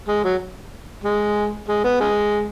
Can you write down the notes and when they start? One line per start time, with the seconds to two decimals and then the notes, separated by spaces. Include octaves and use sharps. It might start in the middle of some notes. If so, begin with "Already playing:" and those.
0.08 G#3
0.24 F#3
1.04 G#3
1.68 G#3
1.84 B3
2.00 C#3 G#3